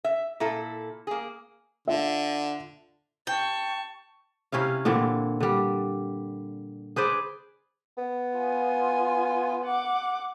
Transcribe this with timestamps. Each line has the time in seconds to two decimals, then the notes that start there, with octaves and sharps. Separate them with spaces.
0.04 E5
0.40 A#2 E4 A4
1.07 A#3 G#4
1.88 D3 F4 E5
3.27 G5 A5 C#6
4.52 C3 C#4 E4 F5
4.85 A#2 D3 E3 C4
5.40 D3 G3
6.96 G#4 B4 C5 D5
7.98 B3
8.38 F4 G#5
9.65 F#5 D6